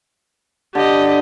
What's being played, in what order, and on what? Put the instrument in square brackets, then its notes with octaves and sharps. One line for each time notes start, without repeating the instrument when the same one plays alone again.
[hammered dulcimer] D3 [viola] G4 D#5